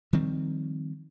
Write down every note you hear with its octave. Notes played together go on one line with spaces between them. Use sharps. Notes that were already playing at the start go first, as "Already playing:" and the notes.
D#3 F3 G3 C4